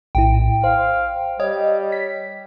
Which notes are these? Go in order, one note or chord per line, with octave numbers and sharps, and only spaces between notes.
A#1 A2 E4 G5
C5 F5
G3 C#5 D#5
B6